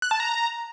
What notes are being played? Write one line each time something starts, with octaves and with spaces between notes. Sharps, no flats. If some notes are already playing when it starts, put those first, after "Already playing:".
F#6
A5
A#5